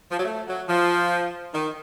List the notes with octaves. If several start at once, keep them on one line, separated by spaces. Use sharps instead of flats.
F3
F#3
A3
F#3
F3
D#3